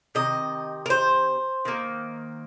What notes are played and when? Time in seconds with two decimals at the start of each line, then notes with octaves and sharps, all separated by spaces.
0.15 C3 D#3 D#5
0.86 A#4
0.90 C5
1.65 D#3 A#3